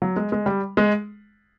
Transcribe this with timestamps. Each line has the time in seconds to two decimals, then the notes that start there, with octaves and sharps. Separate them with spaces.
0.02 F#3
0.16 G#3
0.32 G#3
0.46 G3
0.77 G#3